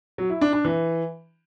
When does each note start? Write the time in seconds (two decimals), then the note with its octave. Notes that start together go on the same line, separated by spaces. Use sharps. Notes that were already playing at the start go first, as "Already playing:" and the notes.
0.18 F#3
0.30 E4
0.41 D4
0.53 D4
0.65 E3